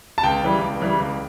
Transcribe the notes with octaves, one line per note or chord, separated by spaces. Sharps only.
A5
C#2 G5
C#3 E3 G3
C#2
C#3 E3 G3
C#2